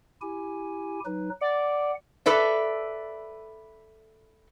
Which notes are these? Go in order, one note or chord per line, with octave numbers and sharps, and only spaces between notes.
E4 G4 G#5
F#3 D#4 B4
D5 F#5
A4 B4 D5 E5